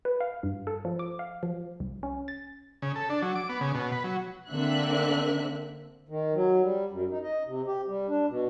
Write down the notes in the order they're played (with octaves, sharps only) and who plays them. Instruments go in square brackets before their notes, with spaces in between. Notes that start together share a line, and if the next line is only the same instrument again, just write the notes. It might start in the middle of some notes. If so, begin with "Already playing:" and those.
[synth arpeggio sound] B4
F5
G2
A4
F3
D6
F5
F3
C2
C#4
A6
[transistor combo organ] C#3
A4
D4
F#3
D6
B3
C#3
B2
B4
F#3
[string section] D3 A#3 C4 E5 F#6
[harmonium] D#3
F#3
G3
F#2
D#4
D#5
C3
G4
G3
D4
B2